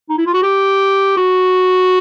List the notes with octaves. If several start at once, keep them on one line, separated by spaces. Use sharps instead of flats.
D#4
E4
F4
F#4
G4
F#4